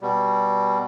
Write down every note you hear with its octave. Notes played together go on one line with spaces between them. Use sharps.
B2 G3